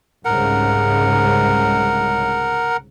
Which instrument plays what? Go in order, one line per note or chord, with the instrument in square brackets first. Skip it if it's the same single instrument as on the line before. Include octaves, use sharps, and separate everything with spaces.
[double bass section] C2 G#2 C#3 [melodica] A#4 F#5